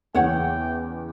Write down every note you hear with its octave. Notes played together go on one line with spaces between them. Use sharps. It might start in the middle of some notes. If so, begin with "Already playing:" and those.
E2 C#3 E3 E4 C#5 F#5 G5